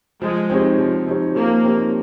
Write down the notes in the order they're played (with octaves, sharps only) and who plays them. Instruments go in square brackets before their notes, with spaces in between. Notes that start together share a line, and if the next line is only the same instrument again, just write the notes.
[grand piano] F3 [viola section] G#3
[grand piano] C4 D#4 G4 C#5
F3
C4 D#4 G4 C#5
[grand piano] F3 [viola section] A#3
[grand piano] C4 D#4 G4 C#5